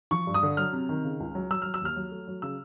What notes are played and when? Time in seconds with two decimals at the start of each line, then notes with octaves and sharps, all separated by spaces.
0.11 F3 C#6
0.27 G2
0.34 D#6
0.43 D3
0.57 F#3 F6
0.73 C3
0.89 D#3
1.04 C#3
1.20 C#2
1.35 F#3
1.50 F#3 E6
1.62 F#3 F6
1.74 E6
1.81 D#2 F6
1.96 F#3
2.11 A3
2.28 F#3
2.42 C#3 E6